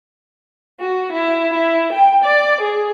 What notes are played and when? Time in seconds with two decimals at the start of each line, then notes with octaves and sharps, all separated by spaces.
0.78 F#4
1.11 E4
1.53 E4
1.92 G5
2.24 D5
2.60 G#4